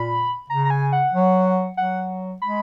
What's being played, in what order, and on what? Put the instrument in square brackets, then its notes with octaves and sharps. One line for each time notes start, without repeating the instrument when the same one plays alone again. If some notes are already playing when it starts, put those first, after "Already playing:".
Already playing: [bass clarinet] A#2 [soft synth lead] B5
[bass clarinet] C#3 [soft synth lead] A#5
[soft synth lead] A#5
G#5
F#5
[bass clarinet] F#3
[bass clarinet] F#3 [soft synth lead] F#5
[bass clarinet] G#3 [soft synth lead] B5